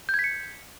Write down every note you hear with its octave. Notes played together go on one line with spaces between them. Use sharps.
G6
G#6
B6
C#7